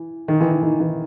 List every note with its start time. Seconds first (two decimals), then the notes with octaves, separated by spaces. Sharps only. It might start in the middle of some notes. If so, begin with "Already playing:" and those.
Already playing: E3
0.28 D#3
0.40 E3
0.51 D#3
0.63 D#3
0.80 E3